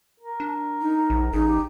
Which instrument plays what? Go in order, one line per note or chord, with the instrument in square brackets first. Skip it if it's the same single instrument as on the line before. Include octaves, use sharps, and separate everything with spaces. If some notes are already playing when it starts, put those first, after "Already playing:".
[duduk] A#4
[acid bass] D4
[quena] D#4
[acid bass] A#1
[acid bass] A1 [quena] D#4 [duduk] G#4
[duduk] G4